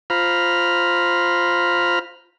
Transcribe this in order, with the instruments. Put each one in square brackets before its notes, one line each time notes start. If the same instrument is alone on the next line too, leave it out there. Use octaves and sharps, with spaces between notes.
[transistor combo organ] F4 C5 A#5 B5 F6